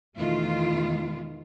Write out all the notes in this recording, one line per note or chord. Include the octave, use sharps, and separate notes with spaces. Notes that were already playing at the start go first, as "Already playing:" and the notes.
E2 B2 D#3 A3 F4